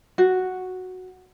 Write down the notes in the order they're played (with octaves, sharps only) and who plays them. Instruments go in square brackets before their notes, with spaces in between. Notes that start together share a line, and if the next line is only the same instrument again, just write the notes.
[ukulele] F#4